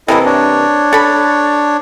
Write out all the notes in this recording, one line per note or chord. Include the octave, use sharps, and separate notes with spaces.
C3 E3 A#3 E4 A4 D#5
D4 C#5
A4 B5